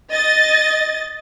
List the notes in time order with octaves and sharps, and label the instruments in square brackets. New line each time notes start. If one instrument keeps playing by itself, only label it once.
[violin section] D#5 A6